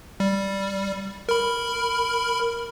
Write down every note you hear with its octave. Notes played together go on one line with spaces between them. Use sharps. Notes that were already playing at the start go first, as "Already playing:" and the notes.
G3
A#4 B5